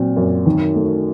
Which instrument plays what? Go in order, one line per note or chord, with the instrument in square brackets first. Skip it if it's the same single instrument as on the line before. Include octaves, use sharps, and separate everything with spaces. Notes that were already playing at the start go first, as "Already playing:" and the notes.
Already playing: [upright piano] A#2 F#3 C4
F#2
D#3
A3